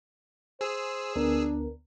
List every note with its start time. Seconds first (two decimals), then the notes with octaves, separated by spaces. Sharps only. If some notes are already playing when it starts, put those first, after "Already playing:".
0.61 G#4 C5 E6
1.16 D2 B3 D4 A#4